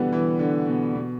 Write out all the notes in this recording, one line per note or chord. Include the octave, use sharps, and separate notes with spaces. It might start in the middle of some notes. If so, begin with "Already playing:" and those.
Already playing: B2 D3 E3 G3 B3
E3
D3
B2
B2